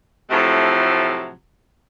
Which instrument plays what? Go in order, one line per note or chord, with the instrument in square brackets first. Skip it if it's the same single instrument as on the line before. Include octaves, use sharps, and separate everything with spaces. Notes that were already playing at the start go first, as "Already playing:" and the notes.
[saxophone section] A2 C3 F3 F#3 A3